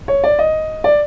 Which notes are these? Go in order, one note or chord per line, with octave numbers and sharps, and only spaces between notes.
C#5
D5
D#5
D5